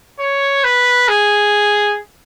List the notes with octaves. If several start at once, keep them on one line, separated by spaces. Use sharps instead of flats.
C#5
B4
G#4